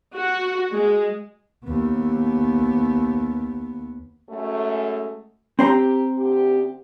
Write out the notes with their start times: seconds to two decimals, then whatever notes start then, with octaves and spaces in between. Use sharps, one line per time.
0.15 F#4
0.72 G#3
1.65 D#2 B3
4.30 F#2 G#3 A3
5.59 C4 G4 C5 A#5
6.17 D2 G4